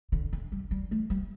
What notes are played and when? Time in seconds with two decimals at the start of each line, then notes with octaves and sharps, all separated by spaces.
0.12 D3
0.33 D3
0.52 G3
0.71 G3
0.91 A3
1.10 G3